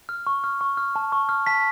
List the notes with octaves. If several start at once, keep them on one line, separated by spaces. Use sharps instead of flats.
F6
C#6
F6
C#6
F6
A5
C#6
F6
A5 B6